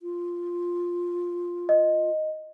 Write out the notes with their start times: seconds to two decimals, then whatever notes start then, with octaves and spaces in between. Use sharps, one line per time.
0.02 F4
1.69 D#5